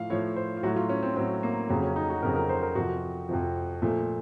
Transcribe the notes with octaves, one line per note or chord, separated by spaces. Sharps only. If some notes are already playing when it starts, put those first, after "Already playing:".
Already playing: A2 F3 F5
A2 F3 C#5
C5
F4
A2 F#3 F#4
F4
C#4
C4
A2 F#3 C4
A#3
F2 C#3 F#3 A#3
C#4
D#4
F#4
F2 C#3 F#3 A#4
A#4
C5
A#4
F2 C3 F3 F#4
F2 C3 F3
A#2 F3 A3